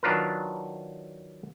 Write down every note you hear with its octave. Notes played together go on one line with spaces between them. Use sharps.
D#3 F#3 D4 F4 A#4 B4